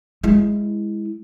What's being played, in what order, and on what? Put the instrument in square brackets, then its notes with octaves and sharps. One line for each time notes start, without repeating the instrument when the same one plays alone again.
[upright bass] G#3 E4